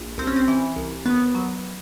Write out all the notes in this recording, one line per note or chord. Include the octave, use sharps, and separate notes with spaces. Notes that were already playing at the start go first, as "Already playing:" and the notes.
Already playing: A#1
C2 C4
C#4
C4
E3
C2
D#2 B3
F#3